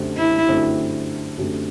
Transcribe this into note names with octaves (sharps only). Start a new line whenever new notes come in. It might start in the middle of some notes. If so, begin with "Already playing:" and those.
Already playing: F#2 D3 A3 C4 G4
E4
F#2 D3 A3 C4 G4
F#2 D3 A3 C4 G4